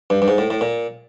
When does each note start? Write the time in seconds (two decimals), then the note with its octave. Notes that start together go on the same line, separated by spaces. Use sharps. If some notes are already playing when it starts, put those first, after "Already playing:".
0.10 G2
0.22 G2
0.28 G#2
0.38 A2
0.50 A2
0.61 A#2